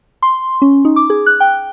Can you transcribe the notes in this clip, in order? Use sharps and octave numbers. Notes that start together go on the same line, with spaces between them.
C6
C#4
D#4
D6
G#4
F#6
G5